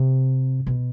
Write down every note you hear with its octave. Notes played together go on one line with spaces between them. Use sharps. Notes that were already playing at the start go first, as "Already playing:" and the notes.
Already playing: C3
B2